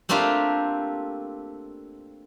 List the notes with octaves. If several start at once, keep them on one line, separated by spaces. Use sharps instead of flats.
A3 A#3 C4 D4 F4 G4